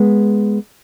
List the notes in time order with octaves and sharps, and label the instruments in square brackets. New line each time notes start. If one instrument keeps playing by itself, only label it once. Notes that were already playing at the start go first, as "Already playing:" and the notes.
Already playing: [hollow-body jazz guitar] G#3 B3